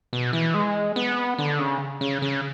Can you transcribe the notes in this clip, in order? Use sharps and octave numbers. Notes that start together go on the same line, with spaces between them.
B2
E3
G#3
B3
D3
C#3
C#3
C#3